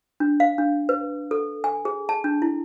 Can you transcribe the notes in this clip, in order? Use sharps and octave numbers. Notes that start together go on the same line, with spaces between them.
D4
F5
D4
B4
A4
G#5
G#4
A5
D4
E4